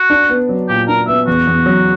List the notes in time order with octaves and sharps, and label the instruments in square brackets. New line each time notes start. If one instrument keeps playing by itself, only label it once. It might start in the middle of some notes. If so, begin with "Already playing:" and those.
Already playing: [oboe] F#4
[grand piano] D4
B3
F#3
[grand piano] A#2 [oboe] G4
[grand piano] D4 [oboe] A#4
[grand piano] B3 [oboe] E5
[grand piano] E2 [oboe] F#4
[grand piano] E2
F#3